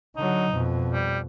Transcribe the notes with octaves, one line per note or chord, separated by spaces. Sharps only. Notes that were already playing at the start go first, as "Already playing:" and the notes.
D3 F#3 D#4
F2 B2
G3